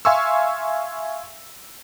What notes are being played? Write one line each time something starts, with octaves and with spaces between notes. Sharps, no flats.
E5 F5 G#5 C6 C#6 E6